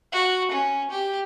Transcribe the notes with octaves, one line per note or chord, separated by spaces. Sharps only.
F#4
C#4
G4